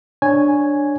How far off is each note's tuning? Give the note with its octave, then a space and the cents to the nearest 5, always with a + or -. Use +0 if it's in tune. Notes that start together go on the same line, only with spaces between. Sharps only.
D4 +0 C#5 +0 G#5 +0